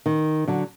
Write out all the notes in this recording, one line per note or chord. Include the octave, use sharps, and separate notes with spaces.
D#3
D3 F#3